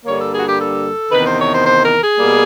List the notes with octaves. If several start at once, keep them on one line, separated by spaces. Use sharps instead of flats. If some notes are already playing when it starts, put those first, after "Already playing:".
G2 D3 G3 A#3 C#5
A4
G#4
F#4
G4
A4
E2 C3 D#3 B4
C5
C#5
C5
C5
A#4
G#4
B2 G3 A#3